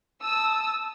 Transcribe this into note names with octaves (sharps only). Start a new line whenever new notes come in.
A5 D#6 E6